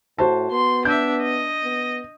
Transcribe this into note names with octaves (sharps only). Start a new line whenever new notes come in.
A2 F#4 C5 A5
B3 C6
D4 E5 G6
D#5
B3